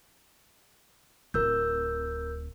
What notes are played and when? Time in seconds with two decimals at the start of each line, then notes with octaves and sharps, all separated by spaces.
1.34 D1 C4 A#4 E6 G6